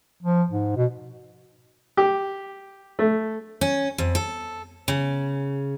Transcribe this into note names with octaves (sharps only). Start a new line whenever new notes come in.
F3
G#2
B2
G4
A3
C#4
F2
A4
C#3